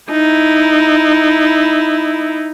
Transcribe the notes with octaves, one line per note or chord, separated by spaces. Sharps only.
D#4 E4